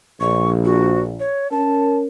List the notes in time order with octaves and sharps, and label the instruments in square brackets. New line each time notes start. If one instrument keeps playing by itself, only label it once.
[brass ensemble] A#1 [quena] C#6
[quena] F#4
C#5
[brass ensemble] C#4 A#4 [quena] A5